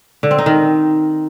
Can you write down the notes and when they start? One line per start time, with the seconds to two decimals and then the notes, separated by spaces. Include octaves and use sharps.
0.23 D3
0.31 C4
0.38 D#4
0.46 D#3